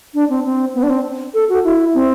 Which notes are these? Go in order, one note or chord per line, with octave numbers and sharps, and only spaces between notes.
D4
C4
C4
B3
D4
C4
A4
F#4
E4
C4